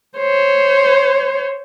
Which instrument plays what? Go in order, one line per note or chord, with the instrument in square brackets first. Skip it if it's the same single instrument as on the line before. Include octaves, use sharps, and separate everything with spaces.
[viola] C5 C#5